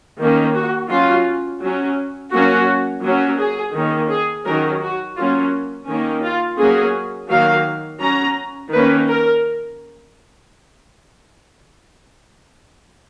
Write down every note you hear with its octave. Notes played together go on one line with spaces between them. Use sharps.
D#3 A#3 C#4
F#4
F#3 C#4 F4
F#3 C#4
F#3 A#3 C#4 F#4
F#3 A#3 C#4
G#4
D#3 A#3 C#4
G#4
D#3 F#3 C#4 A#4
F#4
F#3 A#3 C#4 F4
D#3 A#3 C#4
F4
F#3 A#3 C#4 G#4
D#3 F#3 A#3 F5
F#3 C#4 A#5
D#3 A#3 C#4 B4
A#4